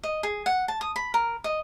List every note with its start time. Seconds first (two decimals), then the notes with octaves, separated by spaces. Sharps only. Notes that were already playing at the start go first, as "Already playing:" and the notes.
0.03 D#5
0.23 G#4
0.46 F#5
0.68 A5
0.81 D#6
0.96 B5
1.14 A#4
1.44 D#5